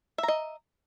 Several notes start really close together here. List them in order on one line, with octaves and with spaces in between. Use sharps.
E5 A#5 D#5